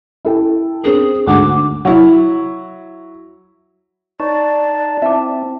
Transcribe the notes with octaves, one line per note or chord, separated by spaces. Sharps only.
E4 A4 G5
C4 D4 G#4 A#4
D2 G#2 F#5 D6
F#3 E4
D#4 C#5 D5 A5 C#6
C4 E4 E5 A5 D6